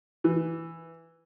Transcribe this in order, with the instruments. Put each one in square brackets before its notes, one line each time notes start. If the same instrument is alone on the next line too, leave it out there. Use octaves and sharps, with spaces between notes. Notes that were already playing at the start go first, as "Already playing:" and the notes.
[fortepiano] E3